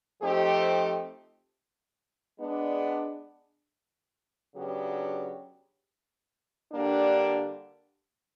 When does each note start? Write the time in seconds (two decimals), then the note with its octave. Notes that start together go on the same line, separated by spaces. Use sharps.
0.22 F3 A3 C4 D#4 G4
2.39 G#3 B3 D4
4.56 C#3 F#3 B3 D4 G4
6.72 D3 G3 A#3 D4